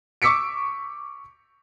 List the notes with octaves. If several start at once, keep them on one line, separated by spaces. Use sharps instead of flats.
C#6 D6 E6 B6 C#7 D7